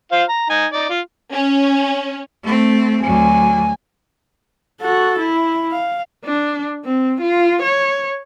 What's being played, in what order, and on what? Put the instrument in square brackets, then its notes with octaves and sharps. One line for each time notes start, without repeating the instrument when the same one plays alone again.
[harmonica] F4 C5 F5
A#5
D#4 G#5
D#4 D5
F4
[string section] C#4
[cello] A3 C4
[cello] D2 F#3 [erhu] G#5
[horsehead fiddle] F#4 A4
E4
F5
D4
C4
F4
C#5